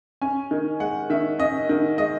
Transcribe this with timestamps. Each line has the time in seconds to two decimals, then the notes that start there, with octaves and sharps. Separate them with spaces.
0.21 C#4 G#5
0.51 D#3
0.80 G#3 F#5
1.10 D#3 E5
1.39 C#4 D#5
1.69 D#3
1.98 G#3 D#5